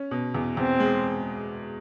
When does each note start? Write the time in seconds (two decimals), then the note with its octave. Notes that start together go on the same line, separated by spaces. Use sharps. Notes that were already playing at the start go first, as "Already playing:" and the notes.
Already playing: C#4
0.11 B2
0.35 E2
0.57 E2 C4
0.80 G#3